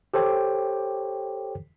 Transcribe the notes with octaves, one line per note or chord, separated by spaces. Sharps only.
G4 A4 C5 C#5 G5 D6